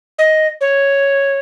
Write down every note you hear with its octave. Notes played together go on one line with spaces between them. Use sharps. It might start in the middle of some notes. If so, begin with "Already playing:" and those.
D#5
C#5